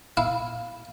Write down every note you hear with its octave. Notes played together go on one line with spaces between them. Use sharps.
E4 F5